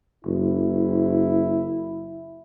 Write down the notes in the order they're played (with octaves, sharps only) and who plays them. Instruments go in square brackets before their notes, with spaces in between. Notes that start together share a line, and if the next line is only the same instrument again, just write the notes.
[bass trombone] F#1 [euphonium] E4